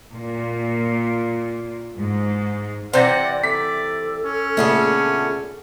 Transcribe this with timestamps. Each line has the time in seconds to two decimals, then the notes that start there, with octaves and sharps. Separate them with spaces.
0.13 A#2
1.97 G#2
2.93 C3 E3 C4 D5 F#5 G6 A#6
3.44 A4 D5 B6
4.25 C#4
4.57 A#2 C#3 A3 B3 D4